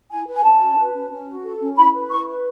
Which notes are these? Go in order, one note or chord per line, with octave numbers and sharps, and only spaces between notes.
E4 G#5
B4
G#5
C#4 A5
F#4
B4
C#4
C#4
F#4
A4
C#4
E4 B5
B4
E4 C#6
B4